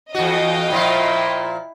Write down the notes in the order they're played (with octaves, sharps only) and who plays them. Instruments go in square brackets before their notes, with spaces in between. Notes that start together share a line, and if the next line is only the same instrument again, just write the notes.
[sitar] E2 F#4 [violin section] D#5 F5 G5
[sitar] A#2 F3 F4 [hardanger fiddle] E4